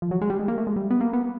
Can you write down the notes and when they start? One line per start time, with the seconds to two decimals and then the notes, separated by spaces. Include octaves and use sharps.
0.02 F3
0.11 F#3
0.21 G#3
0.30 G3
0.39 G#3
0.48 A#3
0.58 A3
0.67 G#3
0.76 G3
0.91 B3
1.01 A#3
1.13 B3